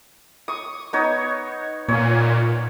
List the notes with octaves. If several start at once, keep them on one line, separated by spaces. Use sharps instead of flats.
C#6 D#6
B3 D#4 C#5
A#2 C#5 G#5